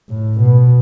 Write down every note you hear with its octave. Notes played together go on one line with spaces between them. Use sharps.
A2
B2